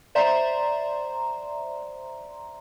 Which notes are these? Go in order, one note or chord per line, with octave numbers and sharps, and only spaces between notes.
C5 D5 E5 A#5 C6